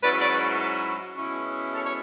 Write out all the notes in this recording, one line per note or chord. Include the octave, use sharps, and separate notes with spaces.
G#2 F#3 C#4 E4 B4 D5
B4 D5
B2 G#3 C#4 E4
A4 C#5
C#5